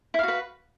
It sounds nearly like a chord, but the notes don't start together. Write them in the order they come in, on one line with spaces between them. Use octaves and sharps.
E4 F5 F#4 B4